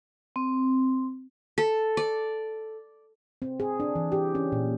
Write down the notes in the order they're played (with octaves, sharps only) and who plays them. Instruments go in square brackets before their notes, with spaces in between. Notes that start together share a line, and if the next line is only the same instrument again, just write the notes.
[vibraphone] C4
[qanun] A4
D5
[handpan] C4
G#4
D4
E3
G4
C#4
A#2